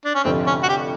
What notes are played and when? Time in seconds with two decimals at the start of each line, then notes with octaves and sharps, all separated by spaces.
0.05 D4
0.15 C#4
0.24 F1 F2 D3 C4
0.47 C#4
0.63 F#4
0.69 G4